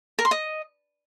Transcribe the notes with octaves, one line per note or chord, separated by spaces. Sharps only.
A#4
C6
D#5